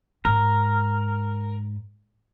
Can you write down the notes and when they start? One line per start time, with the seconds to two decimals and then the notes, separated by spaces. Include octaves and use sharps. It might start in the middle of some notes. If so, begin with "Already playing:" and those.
0.25 G#2 A#4